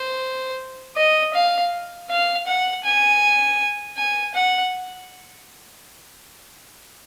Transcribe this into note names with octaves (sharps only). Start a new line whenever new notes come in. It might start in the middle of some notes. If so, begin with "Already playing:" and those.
Already playing: C5
D#5
F5
F5
F#5
G#5
G#5
F#5